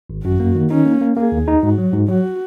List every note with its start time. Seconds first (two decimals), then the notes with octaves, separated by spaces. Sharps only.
0.10 G#1
0.24 F#2 F#4
0.40 A#3
0.55 D#3
0.70 C#4 D#4
0.86 A#3
1.01 A#3
1.17 A#3 G#4
1.32 D#2
1.48 D#4
1.62 G#2 F#4
1.78 F#3
1.93 G#2
2.09 F#3 F#4